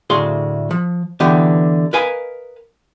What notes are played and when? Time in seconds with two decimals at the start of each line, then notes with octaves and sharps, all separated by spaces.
0.10 D2 A2 F#4 G#4 F5 C6
0.71 F3
1.20 D3 E3 B3 G4
1.93 A#4 B4 D#5 F5 G#5